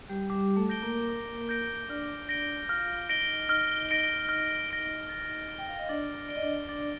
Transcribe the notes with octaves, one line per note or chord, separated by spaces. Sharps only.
G3 G4
G3 G4 D6
A3 A4
G6 A#6 D7 G7
A#3 A#4
D6
G6 A#6 D7 G7
D4 D5 F6
A#6 D7 G7
F4 F5 F6
D#4 D#5 A#6 D7 G7
D#4 D#5 F6
D#4 D#5 A#6 D7 G7
F6
A#6 D7 G7
A6
D7 G7
G5
F5
D#5
D4 D5 A6
D5 D7 G7
D#5
D4 D5
D4 D5 A6